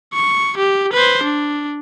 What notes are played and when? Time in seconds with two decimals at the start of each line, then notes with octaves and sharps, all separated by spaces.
0.14 C#6
0.57 G4
0.93 B4 C5
1.23 D4